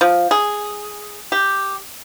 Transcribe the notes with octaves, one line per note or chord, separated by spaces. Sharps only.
F3
G#4
G4